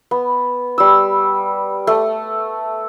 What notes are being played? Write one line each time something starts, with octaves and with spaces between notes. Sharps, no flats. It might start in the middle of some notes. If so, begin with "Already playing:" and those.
B3
G3 E6
A3